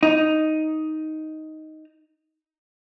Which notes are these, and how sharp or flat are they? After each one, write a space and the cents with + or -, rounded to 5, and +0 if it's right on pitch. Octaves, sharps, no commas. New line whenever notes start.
D#4 +5